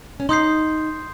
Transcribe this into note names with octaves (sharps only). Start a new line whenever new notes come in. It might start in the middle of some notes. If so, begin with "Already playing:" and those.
C#4
D#4 C6 D#6 G6 C7